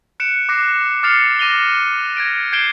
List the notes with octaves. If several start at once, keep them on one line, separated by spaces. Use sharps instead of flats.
F#6 C#7 D7 E7
D6 F#6 A#6 C7
D6 F6 A6 C7 C#7 F7
D6 A#6 D#7 F7 G7
G#6 A#6 D7
G6 G#6 C7 D7 E7 G7